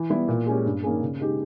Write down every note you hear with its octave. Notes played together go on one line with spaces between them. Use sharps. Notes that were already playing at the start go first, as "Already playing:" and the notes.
Already playing: E3
G3 B3 E4
A#2
G#3 C#4 G4
G2
D#3 A#3 C#4 G#4
C#3
G#3 D#4 G4